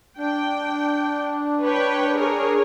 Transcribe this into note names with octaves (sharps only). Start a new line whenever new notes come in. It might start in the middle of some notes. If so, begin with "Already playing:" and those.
D4 G5
B4 C#5 G5
G#4 A#4 C#5